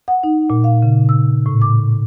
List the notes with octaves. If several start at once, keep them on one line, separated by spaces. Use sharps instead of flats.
F#5
D#4
A#2
F5
C#3
E6
A2
D6